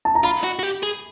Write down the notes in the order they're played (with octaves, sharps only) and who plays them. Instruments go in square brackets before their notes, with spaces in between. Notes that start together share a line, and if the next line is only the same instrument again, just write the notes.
[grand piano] A5
A#5
[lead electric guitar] F4 [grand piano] B5
[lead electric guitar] F#4
F#4
G4
G#4